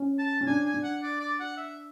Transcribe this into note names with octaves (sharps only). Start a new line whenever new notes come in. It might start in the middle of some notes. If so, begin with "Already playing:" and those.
Already playing: C#4
A5
C#4
D4 G#5
G#5
D4
F#5
D5
D5
F#5
E5